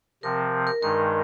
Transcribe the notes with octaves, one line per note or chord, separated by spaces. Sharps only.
C3 F3 C4 A#4
A#4
G2 D#3 G#3 D#4 A#4